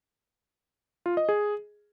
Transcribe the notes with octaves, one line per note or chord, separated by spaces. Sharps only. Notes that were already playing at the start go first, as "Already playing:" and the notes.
F4
D#5
G#4